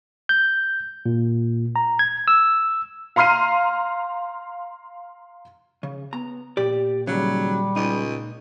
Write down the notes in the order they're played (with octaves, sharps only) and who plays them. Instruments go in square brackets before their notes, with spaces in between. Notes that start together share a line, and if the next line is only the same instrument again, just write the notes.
[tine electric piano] G6
A#2
A#5
G#6
E6
[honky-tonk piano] F5 A#5 C6 F6 C7 D#7
[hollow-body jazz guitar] C#3
[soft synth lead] B3 [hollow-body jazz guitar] A#5
[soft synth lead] A#2 [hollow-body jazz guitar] G4 D5
[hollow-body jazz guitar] D#2 C#3 [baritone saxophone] F#3 [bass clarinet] G3
[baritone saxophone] C#2 [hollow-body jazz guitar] D#4